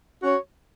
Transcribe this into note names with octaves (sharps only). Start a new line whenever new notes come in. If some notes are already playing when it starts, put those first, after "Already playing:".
C#4 F#4 C#5